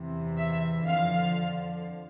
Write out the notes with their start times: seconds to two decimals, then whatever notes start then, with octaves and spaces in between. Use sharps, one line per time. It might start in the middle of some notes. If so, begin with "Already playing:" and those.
Already playing: E2 C3 E3
0.38 E5
0.87 F2 D3 F3 F5